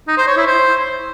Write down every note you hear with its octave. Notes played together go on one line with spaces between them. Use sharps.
D#4
C5
C#5
E4
C5